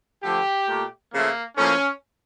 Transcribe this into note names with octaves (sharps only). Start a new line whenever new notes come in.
D3 F3 A3 G4
A#2 A3
C#3 F3 A3 A#3
A2 F3 A#3 C#4